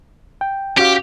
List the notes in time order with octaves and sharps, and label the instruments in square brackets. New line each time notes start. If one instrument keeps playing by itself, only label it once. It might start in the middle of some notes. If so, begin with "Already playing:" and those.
[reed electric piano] G5
[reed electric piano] C#4 F#4 F5 [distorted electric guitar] G4